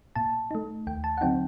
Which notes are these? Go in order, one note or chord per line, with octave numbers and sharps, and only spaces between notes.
A#2 A5
A3 D#4
D#2 G5
A5
F#5
D3 F#3 C4 D#4 G5